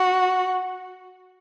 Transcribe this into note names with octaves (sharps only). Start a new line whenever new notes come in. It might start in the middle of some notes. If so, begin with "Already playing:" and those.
Already playing: F#4